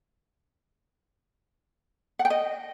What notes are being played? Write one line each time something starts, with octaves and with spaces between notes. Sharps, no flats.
F#5
G5
D#5